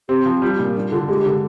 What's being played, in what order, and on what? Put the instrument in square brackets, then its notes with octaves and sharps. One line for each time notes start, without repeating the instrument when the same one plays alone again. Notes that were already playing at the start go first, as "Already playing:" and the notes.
[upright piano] C4 [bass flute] G4
[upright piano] F3
[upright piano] G3 [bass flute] F4
[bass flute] F4
[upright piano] A#2 [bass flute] D#4
[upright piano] G3 [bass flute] D4
[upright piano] D3 [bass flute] F4
[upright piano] G#3 [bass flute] G4
[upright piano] D3